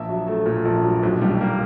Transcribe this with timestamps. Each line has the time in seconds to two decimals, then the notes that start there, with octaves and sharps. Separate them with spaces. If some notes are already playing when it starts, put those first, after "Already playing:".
Already playing: A#1 E5
0.09 F#3
0.27 A3
0.46 A#2
0.65 A#1
0.83 F#3
1.03 B1
1.22 G3
1.41 A#3